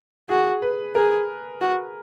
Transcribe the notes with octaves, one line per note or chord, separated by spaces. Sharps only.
F#4 G#4
B4
G#4 A#4
F#4